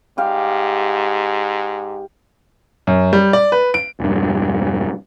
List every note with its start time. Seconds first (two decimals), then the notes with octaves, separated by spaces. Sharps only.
0.18 G#2 G4 F5
2.87 F#2
3.13 G3
3.33 D5
3.52 B4
3.74 D7
4.00 E1 G2